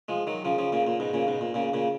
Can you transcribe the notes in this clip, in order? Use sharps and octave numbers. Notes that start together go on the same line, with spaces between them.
F3 G#3
D#3 F#3
C#3 F3
C#3 F3
A#2 C#3
A#2
G#2 B2
A#2 C#3
G#2 B2
A#2
A#2 C#3
A#2 C#3